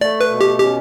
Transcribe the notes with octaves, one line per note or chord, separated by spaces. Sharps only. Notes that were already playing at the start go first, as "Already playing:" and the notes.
A3 D5
B4
B2
G4
C#4 G4